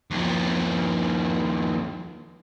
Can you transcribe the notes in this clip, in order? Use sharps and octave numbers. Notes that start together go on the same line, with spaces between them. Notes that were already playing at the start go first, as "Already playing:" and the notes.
D#2 F3